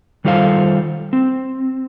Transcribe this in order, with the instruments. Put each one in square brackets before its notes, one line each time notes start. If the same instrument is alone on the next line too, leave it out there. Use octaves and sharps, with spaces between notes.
[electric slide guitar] D#3 G3 F4 A4 C5 F5
C4